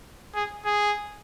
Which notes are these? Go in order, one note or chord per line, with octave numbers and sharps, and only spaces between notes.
G#4
G#4